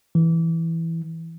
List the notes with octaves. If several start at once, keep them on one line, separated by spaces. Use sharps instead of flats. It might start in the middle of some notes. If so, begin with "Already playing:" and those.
E3